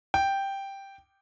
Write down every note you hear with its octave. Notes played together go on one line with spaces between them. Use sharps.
G5